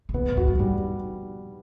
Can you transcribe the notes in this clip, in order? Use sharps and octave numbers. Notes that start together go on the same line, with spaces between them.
C3
B2 B3
A2
E2 F#4
F#2
G2 G3